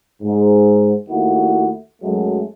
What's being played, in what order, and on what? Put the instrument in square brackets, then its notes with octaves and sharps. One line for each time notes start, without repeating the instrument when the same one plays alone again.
[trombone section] G#2
D#2 A3 E4 F#4
F#2 F#3 G#3 A3